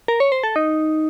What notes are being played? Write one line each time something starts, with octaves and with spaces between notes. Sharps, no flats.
A#4
C#5
C5
A4
D#4